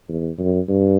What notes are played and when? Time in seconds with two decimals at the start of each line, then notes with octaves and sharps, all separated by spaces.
0.09 E2
0.39 F#2
0.68 G2